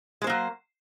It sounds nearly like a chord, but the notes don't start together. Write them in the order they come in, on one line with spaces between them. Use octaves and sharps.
G#3 C5 A#3 F#3